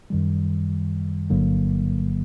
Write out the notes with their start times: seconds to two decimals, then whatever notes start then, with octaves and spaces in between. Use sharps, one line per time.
0.10 F#2 D#3 G3
1.30 G1 G2 D3 F#3 A#3